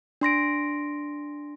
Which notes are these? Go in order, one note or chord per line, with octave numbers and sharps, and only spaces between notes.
D4 C6 A#6 D7